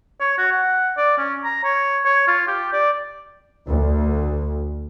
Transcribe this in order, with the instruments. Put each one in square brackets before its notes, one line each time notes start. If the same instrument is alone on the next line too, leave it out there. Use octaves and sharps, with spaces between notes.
[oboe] C#5
F#4
F#5
D5
C#4
A#5
C#5
C#5
F4
G4
D5
[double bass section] D2